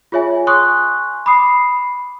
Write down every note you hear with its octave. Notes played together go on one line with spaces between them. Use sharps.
F4 G#4 C#5 E5 G#5
G#5 C6 C#6 D#6 F#6
B5 D6 D#6 C7